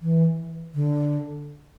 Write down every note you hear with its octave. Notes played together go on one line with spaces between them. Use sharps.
E3
D3